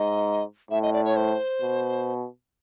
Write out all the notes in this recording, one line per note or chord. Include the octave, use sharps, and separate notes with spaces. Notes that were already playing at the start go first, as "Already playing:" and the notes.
Already playing: G#2 D#5
A2 E5
D#5
D5
C#5
C5
B2